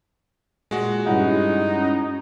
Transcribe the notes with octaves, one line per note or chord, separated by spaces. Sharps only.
A#2 G#3 F#4
G2 C#4 D#4 E4 F#5